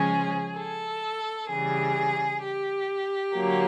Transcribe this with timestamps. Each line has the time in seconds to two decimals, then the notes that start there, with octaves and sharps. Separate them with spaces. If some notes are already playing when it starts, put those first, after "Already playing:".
Already playing: C#3 F3 G#3 C#4 G#4
0.57 A4
1.50 C#3 E3 G3 G#4
2.42 G4
3.34 D3 F#3 A#3